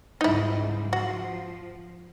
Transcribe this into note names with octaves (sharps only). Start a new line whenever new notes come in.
C#2 G#2 G3 D#4 E4
F3 F#4